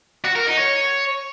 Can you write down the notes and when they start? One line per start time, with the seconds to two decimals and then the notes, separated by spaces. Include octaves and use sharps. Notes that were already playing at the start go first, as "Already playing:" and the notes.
0.24 F#4
0.35 A#4
0.46 D#4
0.57 C#5